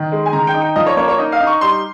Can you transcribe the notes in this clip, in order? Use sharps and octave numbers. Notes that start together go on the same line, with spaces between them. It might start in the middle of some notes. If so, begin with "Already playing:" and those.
Already playing: D#3
G#3
G#5
D#3 A#5
G5
D#4
G5
F3 D#5
C#5
A#3 C#5
C#5
D#4 D#5
F5
D#4
C#6
G3 C6